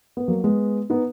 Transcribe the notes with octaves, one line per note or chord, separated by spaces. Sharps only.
B3
F#3 A#3
G#3 B3
B3 D#4